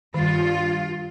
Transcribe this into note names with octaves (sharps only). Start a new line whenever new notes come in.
G2 D#3 F4